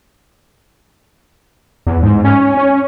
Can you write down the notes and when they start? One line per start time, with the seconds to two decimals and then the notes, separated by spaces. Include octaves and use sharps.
1.87 E2
2.03 G#2
2.24 C#4
2.57 C#4